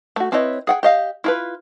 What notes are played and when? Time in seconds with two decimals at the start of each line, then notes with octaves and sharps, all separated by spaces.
0.16 A3 F#4
0.32 C4 E4 B4 C#5 D#5
0.67 G#4 F#5 G5
0.83 G4 D#5 F5
1.24 E4 F4 B4